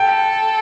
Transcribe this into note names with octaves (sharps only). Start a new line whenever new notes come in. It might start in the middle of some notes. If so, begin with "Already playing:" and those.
Already playing: A4 G5